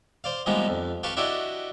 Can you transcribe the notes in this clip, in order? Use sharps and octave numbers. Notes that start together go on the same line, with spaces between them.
C5 D5 F5
F3 G3 G#3 A#3 B3 D#4
F2
G4 B4 F5 A5 C#6
D4 E4 F#4 G4 D5 D#5